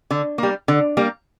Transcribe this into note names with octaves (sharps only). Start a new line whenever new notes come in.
D3
G3 A#3
D3
G3 A#3